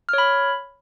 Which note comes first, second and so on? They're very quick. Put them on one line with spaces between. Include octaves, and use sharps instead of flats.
F6 C#5 B5